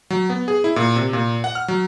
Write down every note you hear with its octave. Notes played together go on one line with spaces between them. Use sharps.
F#3
B3
G#4
E4
A#2
C3
A#2
F#5
F6
F#3